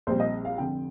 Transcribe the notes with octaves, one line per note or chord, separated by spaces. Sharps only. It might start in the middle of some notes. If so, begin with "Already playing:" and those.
A#1 A#2 G3 C4 C5
D#5
F5
F1 F2 D3 G5